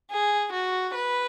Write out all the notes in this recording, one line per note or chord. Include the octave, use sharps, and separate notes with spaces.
G#4
F#4
B4